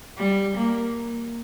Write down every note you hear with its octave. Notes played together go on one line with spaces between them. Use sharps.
G3
A#3